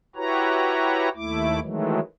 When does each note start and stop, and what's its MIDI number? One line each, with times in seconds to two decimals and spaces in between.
0.16 1.09 64
0.16 1.09 66
0.16 1.09 67
0.16 1.09 71
0.16 1.09 73
0.16 1.09 82
1.16 1.60 39
1.16 1.60 57
1.16 1.60 64
1.16 1.60 86
1.62 2.00 51
1.62 2.00 52
1.62 2.00 54
1.62 2.00 56
1.62 2.00 57